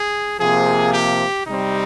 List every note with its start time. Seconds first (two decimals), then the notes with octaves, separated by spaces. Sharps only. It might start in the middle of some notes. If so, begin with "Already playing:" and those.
Already playing: G#4
0.40 C3 F3 A#3 G#4
0.93 G4
1.47 C3 G3 C4 D#4